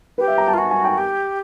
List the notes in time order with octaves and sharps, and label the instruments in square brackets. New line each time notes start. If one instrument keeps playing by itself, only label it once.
[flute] G4 [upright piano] B4
[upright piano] E5
A#5
A5
[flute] F4
[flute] F#4 [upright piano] G#5
[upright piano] G#5
G5
[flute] G4